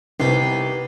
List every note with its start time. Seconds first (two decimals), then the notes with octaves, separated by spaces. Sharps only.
0.20 C2 B3 D#4 G4 B4 C7